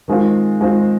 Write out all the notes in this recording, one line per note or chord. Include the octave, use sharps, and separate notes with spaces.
D#3 G#3 C4 F4
D#3 G#3 C4 F4